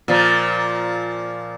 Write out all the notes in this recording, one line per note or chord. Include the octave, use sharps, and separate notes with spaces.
A#2 F3